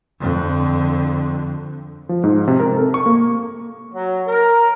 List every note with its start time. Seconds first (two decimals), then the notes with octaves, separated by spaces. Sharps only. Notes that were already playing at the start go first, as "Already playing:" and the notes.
0.20 F2 D3
2.09 F3
2.24 G#2
2.48 C3
2.60 A#4
2.76 A4
2.94 C#6
3.06 A#3
3.93 F#3
4.26 A#4